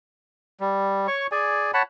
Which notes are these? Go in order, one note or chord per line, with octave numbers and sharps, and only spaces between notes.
G3
C#5 C#6
G#4 D5 G#5
C#5 F#5 A5 B5